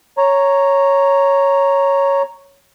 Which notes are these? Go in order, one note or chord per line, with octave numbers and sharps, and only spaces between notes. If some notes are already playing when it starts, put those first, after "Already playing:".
C#5 A#5